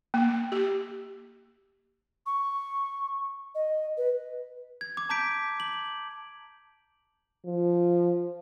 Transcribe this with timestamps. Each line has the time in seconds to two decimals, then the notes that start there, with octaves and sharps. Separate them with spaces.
0.14 A#3
0.52 G4
2.26 C#6
3.55 D#5
3.97 B4
4.81 G#6
4.97 D6
5.09 A5 A#5 D6 G6 B6 D7
5.60 F#7
7.45 F3